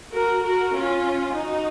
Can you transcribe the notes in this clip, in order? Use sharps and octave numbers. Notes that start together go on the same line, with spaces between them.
F#4 A#4
F#4 A#4
C#4 F4
D#4 F#4